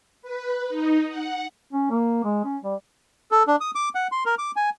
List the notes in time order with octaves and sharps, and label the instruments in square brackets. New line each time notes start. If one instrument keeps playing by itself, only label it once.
[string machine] B4
D#4
F#5
[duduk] C#4
A#3
G#3
C#4
G3
[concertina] A4
D4
D#6
D6
F#5
C6
A#4
D6
G#5